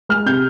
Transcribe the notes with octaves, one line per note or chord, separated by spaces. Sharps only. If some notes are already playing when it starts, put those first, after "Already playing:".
G#3 F6
C3 G6